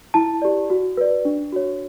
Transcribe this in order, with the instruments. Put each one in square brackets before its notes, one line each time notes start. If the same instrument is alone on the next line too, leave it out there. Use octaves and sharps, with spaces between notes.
[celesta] E4 A5
G4 D5
F#4
B4 D5
D4
F#4 C#5